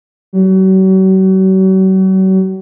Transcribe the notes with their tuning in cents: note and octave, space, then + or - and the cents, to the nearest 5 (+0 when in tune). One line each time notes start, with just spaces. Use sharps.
F#3 +40